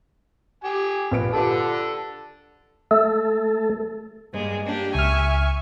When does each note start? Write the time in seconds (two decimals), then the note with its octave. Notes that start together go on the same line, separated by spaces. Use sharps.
0.64 G4 G#5
1.12 A#1 B4 D7
1.33 D3 F4 G4 A4 B4
2.91 A3 A4
4.32 G2 G#3 A#3
4.64 A#3 D4 G4
4.94 C#2 E5 G#5 C#6 F6